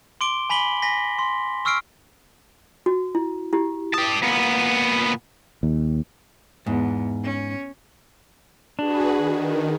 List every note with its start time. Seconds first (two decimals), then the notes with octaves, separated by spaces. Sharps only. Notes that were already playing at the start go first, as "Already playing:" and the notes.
0.21 C6 D6 D7 G7
0.50 G#5 B5 B6 F#7 G7
0.82 G#5 A#6 B6
1.19 C6
1.65 C#6 E6 F6 C7 D7
2.86 F#4
3.15 E4
3.53 E4 G4
3.94 G4 A5 D#6
4.23 A#2 B3
5.63 D#2
6.66 E2 G#2
7.24 C#4
8.79 D4 F#4 G#4 B4
9.17 D#3